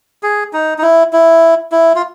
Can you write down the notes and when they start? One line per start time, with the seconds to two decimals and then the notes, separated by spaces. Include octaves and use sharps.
0.23 G#4
0.53 D#4
0.78 D#4
0.82 E4
1.13 E4
1.72 E4
1.96 F4